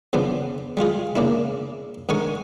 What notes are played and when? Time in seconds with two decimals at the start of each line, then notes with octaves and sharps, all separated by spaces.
0.13 C#3 F3 B3 D4
0.77 G3 G#3 F4 G#4
1.16 C#3 A#3 D4 E4
2.09 G#2 D3 A#4 G#5 C#6